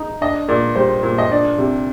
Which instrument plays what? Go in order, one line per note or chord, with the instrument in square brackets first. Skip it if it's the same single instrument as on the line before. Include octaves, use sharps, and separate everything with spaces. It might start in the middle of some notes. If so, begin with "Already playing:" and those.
Already playing: [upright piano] D#4
D4 D#5
A#2 D5
G3 C5
A#2
D#5
D4 D5
C3